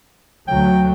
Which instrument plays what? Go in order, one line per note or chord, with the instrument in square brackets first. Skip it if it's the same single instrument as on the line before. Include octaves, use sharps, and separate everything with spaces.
[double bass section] D2 F#3 A3 [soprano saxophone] G5